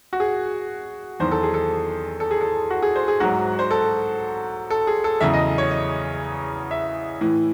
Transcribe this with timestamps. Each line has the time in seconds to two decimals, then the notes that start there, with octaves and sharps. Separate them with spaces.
0.13 F#4
0.20 G#4
1.20 E2 D#3 F#3 C5
1.31 A4
1.43 G#4
1.54 A4
2.20 A4
2.31 G#4
2.41 A4
2.70 F#4
2.82 G#4
2.96 C5
3.08 G#4
3.20 G#2 F#3 F#4
3.59 C5
3.71 A4
4.70 A4
4.87 G#4
5.04 A4
5.20 E2 C#3 F#3 E5
5.33 D#5
5.58 C#5
5.71 D#5
6.71 E5
7.21 A2 E3